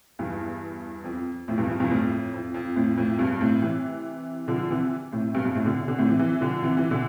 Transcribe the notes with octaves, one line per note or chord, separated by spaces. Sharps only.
E2 G2
F2
F2 A2
E2 G2
F2
E2 G2
F2 A2
F2
F2
F2 A2
F2 A2
G2 B2
A2 C3
C3 E3
D3 F3
C3 E3
A2 C3
G2 B2
G2 B2
A2 C3
B2 D3
B2 D3
A2 C3
C3 E3
C3 E3
D3 F3
C3 E3
C3 E3
B2 D3